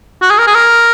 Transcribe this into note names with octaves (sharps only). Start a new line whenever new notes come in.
F#4
G#4
A#4
G#4
A#4